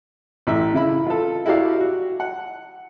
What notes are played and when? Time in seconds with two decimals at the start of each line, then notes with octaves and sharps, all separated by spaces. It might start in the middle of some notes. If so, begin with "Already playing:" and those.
0.47 A1 E5
0.74 C#3 E4 B5
1.07 F4 A4
1.46 E4 F#4 G4 D5 F5
1.80 F#4
2.20 F#5